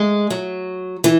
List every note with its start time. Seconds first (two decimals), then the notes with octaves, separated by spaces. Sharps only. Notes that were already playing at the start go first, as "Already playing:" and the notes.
Already playing: G#3
0.30 F#3
1.04 E3